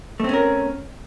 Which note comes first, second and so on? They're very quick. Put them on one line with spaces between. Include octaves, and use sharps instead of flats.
A3 C4 C#4 A#4